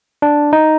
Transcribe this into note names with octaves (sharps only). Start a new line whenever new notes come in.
D4
D#4